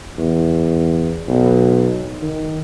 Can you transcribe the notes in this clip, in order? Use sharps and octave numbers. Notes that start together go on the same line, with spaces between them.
E2
B1
D#3